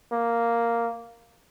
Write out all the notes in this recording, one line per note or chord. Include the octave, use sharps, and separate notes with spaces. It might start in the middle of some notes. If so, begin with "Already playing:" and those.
A#3